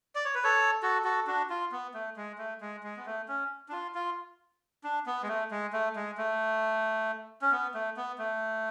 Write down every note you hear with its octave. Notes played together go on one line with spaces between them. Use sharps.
D5
C#5
B4
A4 C#5
F#4 A4
F#4 A4
D4 F#4
F4
B3
A3
G#3
A3
G#3
G#3
B3
A3
C#4
D4
F4
F4
D4
B3
G#3
A3
G#3
A3
G#3
A3
C#4
B3
A3
B3
A3